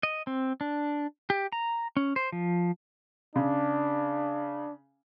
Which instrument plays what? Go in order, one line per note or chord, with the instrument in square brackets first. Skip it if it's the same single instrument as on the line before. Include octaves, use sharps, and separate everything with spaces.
[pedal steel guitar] D#5
C4
D4
G4
A#5
C#4
C5
F3
[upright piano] C#3 [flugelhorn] D4